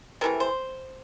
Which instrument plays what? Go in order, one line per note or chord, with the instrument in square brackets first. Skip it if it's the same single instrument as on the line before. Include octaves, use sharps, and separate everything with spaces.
[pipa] C3 E3 A3 A#4
C5